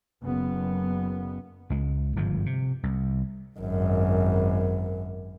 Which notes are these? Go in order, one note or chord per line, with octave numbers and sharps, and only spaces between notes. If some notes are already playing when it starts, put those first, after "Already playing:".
F#1 B3
C#2 G#3
G1 G#2 F3
C3
C2
G#1 F#2